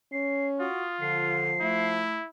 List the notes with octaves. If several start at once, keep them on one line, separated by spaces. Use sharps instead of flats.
C#4 C7
F4 F#4 D#6
D3 F3 C7
A3 E4